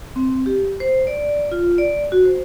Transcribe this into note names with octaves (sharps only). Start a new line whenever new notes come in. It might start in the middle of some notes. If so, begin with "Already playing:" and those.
C4
G4
C5
D5
F4
D5
F#4
C5